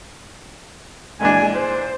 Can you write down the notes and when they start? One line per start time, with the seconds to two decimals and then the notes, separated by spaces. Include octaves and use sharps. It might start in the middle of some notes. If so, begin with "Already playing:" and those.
1.21 A#2 E3 G#3 D4 G#5
1.55 C5